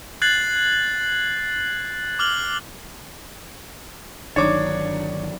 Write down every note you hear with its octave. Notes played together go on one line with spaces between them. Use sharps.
F#6 G#6 A6 C7 F#7
D6 F6 F#7 G7
G1 D#3 F#3 D4 D#4 C#5 D5 D6